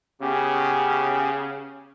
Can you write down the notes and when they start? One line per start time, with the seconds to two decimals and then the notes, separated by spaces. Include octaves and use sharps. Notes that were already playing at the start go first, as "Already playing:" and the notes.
0.22 C#3 B3 C#4 G4